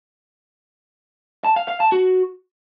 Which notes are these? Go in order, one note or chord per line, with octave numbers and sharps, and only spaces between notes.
A5
F5
F5
A5
F#4